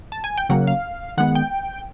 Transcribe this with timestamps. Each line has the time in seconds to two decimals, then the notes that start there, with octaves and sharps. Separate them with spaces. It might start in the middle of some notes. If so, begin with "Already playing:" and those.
0.12 A5
0.24 G#5
0.37 G5
0.49 C#3 F#3 A#3 F#5
0.67 F5
1.17 D#3 G#3 B3 F#5
1.35 G5